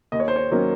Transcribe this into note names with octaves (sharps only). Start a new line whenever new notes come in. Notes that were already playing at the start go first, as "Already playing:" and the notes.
D#2 D#5
C#5
C5
C#5
D#3 F#3 A#3 C#4